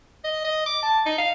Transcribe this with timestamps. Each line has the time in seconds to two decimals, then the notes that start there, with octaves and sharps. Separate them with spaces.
0.24 D#5
0.44 D#5
0.66 D6
0.83 A5
1.06 D#4
1.18 F5